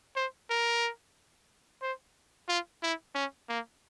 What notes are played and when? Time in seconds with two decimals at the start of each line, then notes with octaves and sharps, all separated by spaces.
0.16 C5
0.50 A#4
1.82 C5
2.48 F4
2.83 E4
3.15 C#4
3.49 A#3